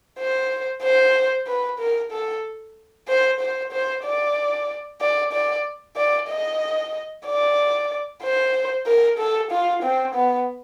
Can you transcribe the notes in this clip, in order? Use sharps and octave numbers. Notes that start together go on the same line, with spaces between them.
C5
C5
B4
A#4
A4
C5
C5
C5
D5
D5
D5
D5
D#5
D5
C5
A#4
A4
F4
C4
B3